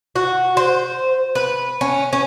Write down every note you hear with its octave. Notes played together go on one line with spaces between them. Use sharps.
F#4
C5
B4
C#4
C#4